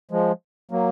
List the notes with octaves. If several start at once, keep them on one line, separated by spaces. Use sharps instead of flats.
F3 G#3
F#3 A#3